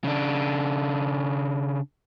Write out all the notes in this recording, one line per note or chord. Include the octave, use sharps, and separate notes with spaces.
C#3 D4